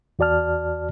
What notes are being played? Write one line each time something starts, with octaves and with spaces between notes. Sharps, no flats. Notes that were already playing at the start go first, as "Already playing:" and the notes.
E2 F#4 D5 A5 F6